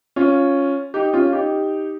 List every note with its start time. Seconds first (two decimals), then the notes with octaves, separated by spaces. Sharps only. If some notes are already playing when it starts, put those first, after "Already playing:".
0.16 C#4 F4
0.94 D#4 G4
1.14 C#4 F4
1.33 D#4 G4